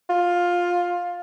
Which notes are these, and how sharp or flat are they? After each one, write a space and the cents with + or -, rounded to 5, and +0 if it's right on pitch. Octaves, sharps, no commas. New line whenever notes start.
F4 +15